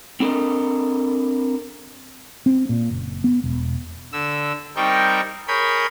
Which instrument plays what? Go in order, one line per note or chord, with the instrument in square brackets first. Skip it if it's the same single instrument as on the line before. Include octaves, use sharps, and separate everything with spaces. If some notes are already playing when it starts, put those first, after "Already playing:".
[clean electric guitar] C4 D4 A4 A#4 D#5
[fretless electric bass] C4
A#2
F#1
B3
E1
[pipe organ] D3 E6
G3 C4 D#4 A#4 G5 C#6
G#4 A#4 C#5 B5 G6 G#6